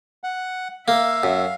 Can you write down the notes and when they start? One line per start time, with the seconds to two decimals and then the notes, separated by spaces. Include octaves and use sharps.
0.24 F#5
0.88 A#3 E5 F5
1.23 F#2